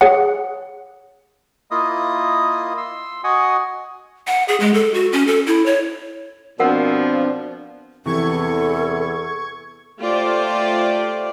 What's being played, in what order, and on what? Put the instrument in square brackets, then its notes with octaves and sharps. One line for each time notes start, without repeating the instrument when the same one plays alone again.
[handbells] G#4 C#5 F#5
[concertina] A#3 E4 F4 D#5 D#6
C6 E6
F#4 D#5 F#5 G#5 D#6
[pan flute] F#5
G#4
G#3
A4
F#4
C#4
A4
E4
C#5
[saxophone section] B2 F3 [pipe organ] C4 D4 [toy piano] A#4 F#5
[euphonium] E2 [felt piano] C3 E3 [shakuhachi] A4 [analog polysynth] C#6 G#6
[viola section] A3 F4 G4 C5 D5